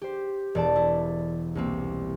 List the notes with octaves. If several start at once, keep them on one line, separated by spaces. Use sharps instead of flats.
G4 C5
E1 D5 A5
E4
C2 A#3 C4